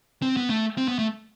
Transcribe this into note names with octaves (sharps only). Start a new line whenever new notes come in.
C4
B3
A3
C4
B3
A3